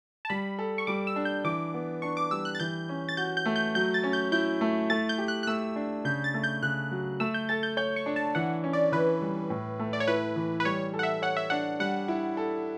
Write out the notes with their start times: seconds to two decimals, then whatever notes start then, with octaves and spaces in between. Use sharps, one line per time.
0.25 A5
0.30 G3 B5
0.59 A4
0.78 C#6
0.87 G3 D6
1.07 E6
1.16 D4
1.25 G6
1.44 E3 D6
1.74 B3
2.02 D4 C#6
2.17 D6
2.31 G3 E6
2.45 F#6
2.55 A6
2.60 E3 G6
2.89 C#4
3.09 A6
3.17 F#4 G6
3.37 G6
3.46 A3
3.56 G6
3.75 F#3 G6
3.94 A6
4.04 C#4
4.13 G6
4.32 E4 G6
4.61 A3
4.90 A3 A6
5.09 G6
5.18 G4
5.28 F#6
5.43 F#6
5.47 A3 E6
5.76 D4
6.05 C#3 G6
6.24 A6
6.34 A3
6.44 G6
6.63 C#3 F#6
6.91 F#3
7.20 A3 E6
7.34 G6
7.49 A4 A6
7.63 G6
7.77 C#5 G6
7.96 C#6
8.06 D4
8.16 A5
8.35 E3 F#5
8.64 C#4
8.73 D5
8.92 E3 B4
9.21 G3
9.50 A2
9.79 A3
9.93 D5
10.00 C#5
10.07 E4 B4
10.36 E3
10.60 B4
10.65 G3 C#5
10.94 A4
10.99 F#5
11.03 E5
11.22 C#5 F#5
11.37 E5
11.50 D4 F#5
11.80 G3 F#5
12.08 E4
12.37 A4